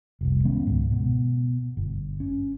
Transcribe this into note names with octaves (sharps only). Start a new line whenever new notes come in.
F1 C2
D#3 G#3 B3 C#4
C#2 G#2
B2
G1
C#4